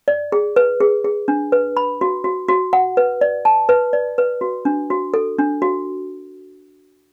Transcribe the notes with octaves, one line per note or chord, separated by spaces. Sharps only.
D5
G#4
B4
G#4
G#4
D4
B4
B5
F#4
F#4
F#4
F#5
B4
D5
A5
B4
D5
B4
F#4
D4
F#4
A4
D4
F#4